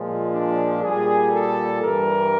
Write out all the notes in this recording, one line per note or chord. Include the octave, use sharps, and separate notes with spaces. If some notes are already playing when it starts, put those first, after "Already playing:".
Already playing: A#2 F3 G#3
D4
A#2 G3 G#4
A4
G2 E3 G3 A#4